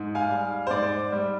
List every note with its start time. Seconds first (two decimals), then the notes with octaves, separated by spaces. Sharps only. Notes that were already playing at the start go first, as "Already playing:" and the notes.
Already playing: G#2
0.15 F5 G#5
0.30 G3
0.67 C5
0.71 G#2 D5
1.12 G3